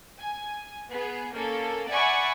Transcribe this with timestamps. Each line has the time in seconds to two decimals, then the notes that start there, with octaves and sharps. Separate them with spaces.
0.20 G#5
0.89 B3 G#4
1.33 A#3 C#4 A4
1.89 D5 E5 F#5 G#5 B5 C#6